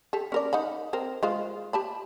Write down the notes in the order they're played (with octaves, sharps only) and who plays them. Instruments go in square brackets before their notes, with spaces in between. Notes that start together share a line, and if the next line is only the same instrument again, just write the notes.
[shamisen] G4 A4
C#4 A#4 D5
D#4 F#5 B5
C4 A#4
G#3 F4 C5
G4 A5 B5